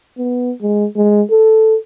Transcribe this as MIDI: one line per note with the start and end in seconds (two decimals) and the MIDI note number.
0.17 0.52 59
0.62 0.86 56
0.96 1.22 56
1.31 1.76 69